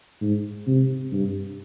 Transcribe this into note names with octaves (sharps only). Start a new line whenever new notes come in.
G#2
C3
G2